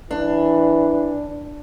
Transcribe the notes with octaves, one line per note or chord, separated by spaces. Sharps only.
E3 D4